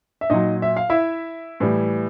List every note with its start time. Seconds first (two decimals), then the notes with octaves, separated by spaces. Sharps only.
0.21 E5
0.30 A#2 F#3 D#4 D#5
0.62 E5
0.77 F5
0.90 E4 E5
1.60 A2 E3 G3